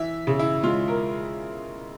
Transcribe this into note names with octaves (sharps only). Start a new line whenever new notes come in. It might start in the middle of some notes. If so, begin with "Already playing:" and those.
Already playing: E3 E5
C#3
E4
G#3 F4
A#4